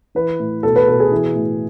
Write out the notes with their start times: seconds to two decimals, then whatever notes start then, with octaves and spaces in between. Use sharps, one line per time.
0.15 E3 B4
0.40 A2
0.63 B2 A4
0.76 B4
0.88 B2 A4
1.00 G#4
1.11 E3
1.35 A2